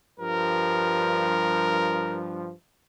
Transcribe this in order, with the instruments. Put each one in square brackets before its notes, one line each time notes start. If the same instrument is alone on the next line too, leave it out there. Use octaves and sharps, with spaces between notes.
[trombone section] G2 F3 [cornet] A#4